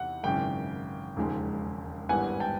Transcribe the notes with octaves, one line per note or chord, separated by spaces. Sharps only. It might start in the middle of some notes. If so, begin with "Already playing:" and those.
Already playing: E2 C3 F#5
G#1 F#2 C#3 E3 G5
E1 D#2 C#3 F3 G#3
G#1 G2 E3 G3 B3 F#5 G#5
G5 A5